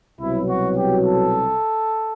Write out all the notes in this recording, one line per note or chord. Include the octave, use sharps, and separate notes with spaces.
C2 B2 F#3 E4
F#4
G4
A4